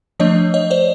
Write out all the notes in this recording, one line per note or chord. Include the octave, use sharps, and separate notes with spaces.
F3 A3 D4 C#5 D#5
C#5 D#5
C5 D5